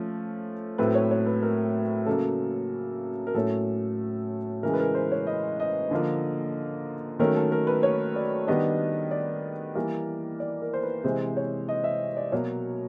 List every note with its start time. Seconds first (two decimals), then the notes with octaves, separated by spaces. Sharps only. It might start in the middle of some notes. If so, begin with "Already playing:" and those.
Already playing: F3 A3 C#4
0.78 A2 F#3 A3 C4 B4
0.95 C#5
1.11 C#5
1.27 B4
1.42 A#4
2.06 C#3 F#3 A#3 A4
3.27 A#4
3.34 A2 F#3 A3 C#4 A4
4.63 C#3 E3 G#3 A#4
4.73 B4
4.80 A#4
4.95 C5
5.12 C#5
5.27 D#5
5.60 D#5
5.91 D3 F3 A#3
7.19 D#3 F#3 A3 C#4 A#4
7.36 A4
7.52 A#4
7.67 B4
7.83 C#5
8.16 D5
8.47 D#3 G3 B3 D4 D#5
9.11 D5
9.75 E3 G3 A#3
10.40 D5
10.62 A#4
10.74 C5
10.83 B4
11.04 C3 E3 G#3 C5
11.37 C#5
11.69 D#5
11.84 E5
12.17 D5
12.32 B2 F#3 A#3 C#5